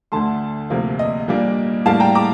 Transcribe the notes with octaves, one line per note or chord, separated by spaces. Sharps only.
D2 D3 A3 A5 C6
D2 C3 F3 A#3
D#5
A#2 G3 A#3 D4
A2 G3 A#3 F5 A5
G5 A#5
A#5 D6